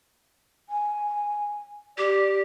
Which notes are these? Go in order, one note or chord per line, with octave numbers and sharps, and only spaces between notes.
G#5
G4 D5